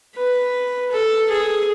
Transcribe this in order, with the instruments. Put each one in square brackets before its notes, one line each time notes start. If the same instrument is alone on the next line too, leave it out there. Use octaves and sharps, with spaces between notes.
[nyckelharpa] B4
A4
G#4